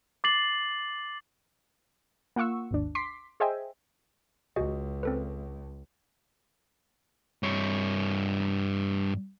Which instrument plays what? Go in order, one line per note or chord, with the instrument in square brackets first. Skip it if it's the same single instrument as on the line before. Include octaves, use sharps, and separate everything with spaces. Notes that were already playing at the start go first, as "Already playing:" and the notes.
[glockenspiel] D6 A6 C7 F#7
[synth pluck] A#3 F4 F#5 C#6 E6
G#1 D#2 D4
C6 D6 B6 C7
G#4 C5 D#5 E5 G5 G#5
[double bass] C#2 [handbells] F#4 G#4 D#5
[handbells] C4 A4 B4
[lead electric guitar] G2 C#5